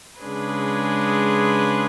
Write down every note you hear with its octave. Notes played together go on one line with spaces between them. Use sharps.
C#3 G#3 D4 G#4 B4